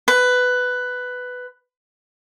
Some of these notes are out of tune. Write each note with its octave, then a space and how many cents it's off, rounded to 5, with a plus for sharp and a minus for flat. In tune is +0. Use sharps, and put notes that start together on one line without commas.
B4 +10